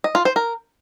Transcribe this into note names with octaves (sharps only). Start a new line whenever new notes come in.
D#5
F4
C5
A#4